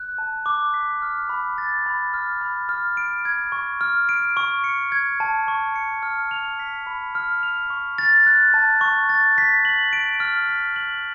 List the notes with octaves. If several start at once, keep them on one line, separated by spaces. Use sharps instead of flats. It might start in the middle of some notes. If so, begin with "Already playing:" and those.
Already playing: F#6
A5
D6
B6
F6
B5
A6
B5
F6
B5
F6
D7
G#6
C#6
F6
D7
C#6
C#7
G#6
A5
C#6
C#7
F6
F7
B6
B5
F6
F7
C#6
A6
F#6
A5
C#6
A6
B6
F#7
D7
F6
B6
F#7